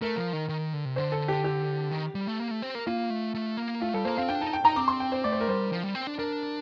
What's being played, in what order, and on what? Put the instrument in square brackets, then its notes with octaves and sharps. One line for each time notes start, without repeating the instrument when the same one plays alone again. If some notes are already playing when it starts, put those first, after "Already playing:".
[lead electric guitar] A3 [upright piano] A#4
[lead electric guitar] F3
D#3
D#3
D3
C3
[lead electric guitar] D3 [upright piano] C5
[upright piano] A4
G4
G4
[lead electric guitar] D#3
G3
A3
A#3
A3
C4
A#3
[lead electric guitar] A#3 [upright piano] F4
[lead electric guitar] A3
A3
A#3
[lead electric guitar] A3 [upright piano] F4
[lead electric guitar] G3 [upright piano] A4
[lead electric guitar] A#3 [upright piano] C5
[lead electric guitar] C4 [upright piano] F5
[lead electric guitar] D4 [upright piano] G5
[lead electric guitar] D#4 [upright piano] A5
[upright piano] G5
[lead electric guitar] D#4 [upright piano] A#5
[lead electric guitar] C4 [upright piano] D6
[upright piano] C6
G5
C5
[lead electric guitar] A3 [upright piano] D5
[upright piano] C5
A#4
[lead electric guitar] G3 [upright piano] C5
[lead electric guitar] F3
G3
C4
D4
[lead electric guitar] D4 [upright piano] A#4